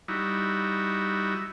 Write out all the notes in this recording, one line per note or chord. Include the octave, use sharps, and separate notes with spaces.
G3 D#4 E4 F#4